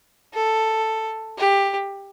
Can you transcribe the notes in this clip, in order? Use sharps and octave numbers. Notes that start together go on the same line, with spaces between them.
A4
G4